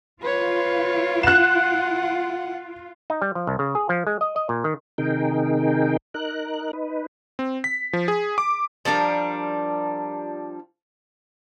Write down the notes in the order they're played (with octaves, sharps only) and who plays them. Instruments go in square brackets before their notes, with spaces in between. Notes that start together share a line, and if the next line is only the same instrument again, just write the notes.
[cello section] F4 [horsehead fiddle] B4 C#5
[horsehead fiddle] F#5 [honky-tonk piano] F#6 E7
[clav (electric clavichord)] D#4
G3
F3
C2
C#3
G#4
F3
G#3
D#5
D#5
A#2
D#3
[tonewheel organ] C3 D#3 D#4 G#4 A#4 G5
D#4 A#4 F#6
D#4 B4
[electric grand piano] C4
B6
F3
G#4
D6
[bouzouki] F3 G3 D4 A#4